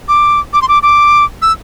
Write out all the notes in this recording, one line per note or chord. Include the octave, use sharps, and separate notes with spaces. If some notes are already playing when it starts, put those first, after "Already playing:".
D6
D6
C6
D6
D6
E6